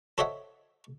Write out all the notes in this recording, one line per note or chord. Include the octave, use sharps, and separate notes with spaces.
A4 C5 C#5 D#5 E5 F#5